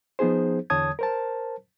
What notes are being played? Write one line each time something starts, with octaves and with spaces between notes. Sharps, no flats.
F3 B3 D#4 G#4 C5
E2 D3 C#5 A5 D#6 G#6
A#4 C5 A5